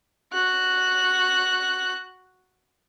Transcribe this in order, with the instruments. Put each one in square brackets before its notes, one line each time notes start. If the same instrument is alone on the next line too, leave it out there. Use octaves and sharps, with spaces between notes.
[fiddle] F#4 F#6